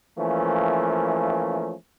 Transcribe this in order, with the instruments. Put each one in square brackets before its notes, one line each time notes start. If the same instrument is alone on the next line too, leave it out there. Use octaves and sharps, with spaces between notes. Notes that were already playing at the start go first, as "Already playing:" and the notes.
[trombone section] E3 F3 A3 A#3 C#4